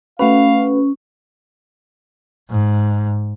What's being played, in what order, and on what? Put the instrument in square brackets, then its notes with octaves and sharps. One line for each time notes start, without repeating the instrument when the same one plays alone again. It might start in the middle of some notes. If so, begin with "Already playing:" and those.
[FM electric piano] A3 F#4 B4 [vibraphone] C#4 [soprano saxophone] F5
[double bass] G#2